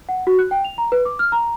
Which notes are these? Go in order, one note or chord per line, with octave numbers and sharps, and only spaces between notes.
F#5
F#4
F#6
G5
F7
A#5
B4
D6
F6
A#5